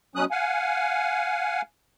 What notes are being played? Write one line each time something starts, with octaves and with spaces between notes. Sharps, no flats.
B2 F#3 C#4 D#6 F#6
F5 F#5 G#5